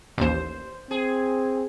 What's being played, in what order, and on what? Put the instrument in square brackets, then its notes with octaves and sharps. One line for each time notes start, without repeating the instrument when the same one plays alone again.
[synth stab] A1 D#2 [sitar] C5 D5
[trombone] C4 [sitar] G#4